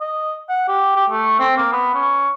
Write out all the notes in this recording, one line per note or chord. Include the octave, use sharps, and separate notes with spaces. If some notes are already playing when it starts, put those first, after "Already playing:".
D#5
F#5
G4
G4
A3
C4
A#3
B3
C#4